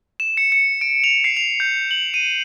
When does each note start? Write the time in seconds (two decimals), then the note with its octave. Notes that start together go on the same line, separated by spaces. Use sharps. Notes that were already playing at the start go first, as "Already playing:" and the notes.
0.20 E7
0.37 C#7
0.52 C#7
0.81 D7
1.04 F7
1.24 C7
1.37 F7
1.60 G6
1.91 F#7
2.14 D#7